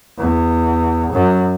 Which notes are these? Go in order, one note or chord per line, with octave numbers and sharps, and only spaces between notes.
E2
F#2